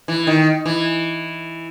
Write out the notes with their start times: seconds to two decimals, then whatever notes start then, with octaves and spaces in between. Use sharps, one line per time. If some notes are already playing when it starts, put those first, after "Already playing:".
0.08 E3
0.27 D#3
0.66 E3